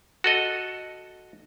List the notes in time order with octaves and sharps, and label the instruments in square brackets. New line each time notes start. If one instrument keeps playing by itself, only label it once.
[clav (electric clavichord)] F#4 A4 D#5